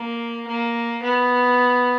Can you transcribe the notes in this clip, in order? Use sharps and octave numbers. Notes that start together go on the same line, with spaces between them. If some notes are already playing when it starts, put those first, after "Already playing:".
Already playing: A#3
A#3
B3